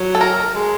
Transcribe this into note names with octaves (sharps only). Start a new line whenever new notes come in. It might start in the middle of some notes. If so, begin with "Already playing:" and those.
Already playing: F#3
A4
A#4
G#3